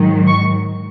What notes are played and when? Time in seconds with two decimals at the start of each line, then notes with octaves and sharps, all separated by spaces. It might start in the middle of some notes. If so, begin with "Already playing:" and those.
Already playing: G#2 D#3 F#3
0.28 C#6